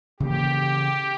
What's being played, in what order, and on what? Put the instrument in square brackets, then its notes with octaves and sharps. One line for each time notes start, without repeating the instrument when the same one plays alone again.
[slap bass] C#3 E3 A#3 [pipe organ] G4